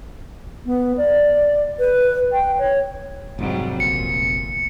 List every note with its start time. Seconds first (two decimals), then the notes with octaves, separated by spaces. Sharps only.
0.66 B3
0.97 D5
1.79 B4
2.33 G5
2.59 C#5
3.39 F1 G#2 F#3 G3 C4
3.80 G1 A#2 C#7